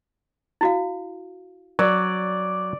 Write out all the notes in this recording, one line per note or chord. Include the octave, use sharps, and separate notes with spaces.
E4 F#4 F5
F#3 D5